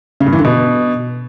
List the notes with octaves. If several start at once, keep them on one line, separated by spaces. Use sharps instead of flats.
C#3
G2
E3
D3
B2